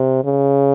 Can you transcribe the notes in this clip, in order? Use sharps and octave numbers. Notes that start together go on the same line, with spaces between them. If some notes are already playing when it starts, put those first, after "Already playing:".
Already playing: C3
C#3